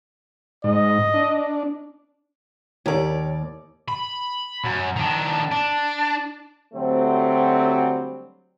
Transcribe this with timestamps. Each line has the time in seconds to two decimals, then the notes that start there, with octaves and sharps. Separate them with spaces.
0.64 G#2 D#5
1.14 D4
2.86 D#2 G4 A#4 C#5 D5
3.88 B5
4.64 F#2
4.96 D#3 D4
5.51 D4
6.74 D2 F#3 G3 A3 C4